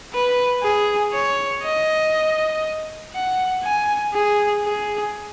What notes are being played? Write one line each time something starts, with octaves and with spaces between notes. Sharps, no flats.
B4
G#4
C#5
D#5
F#5
G#5
G#4
G#4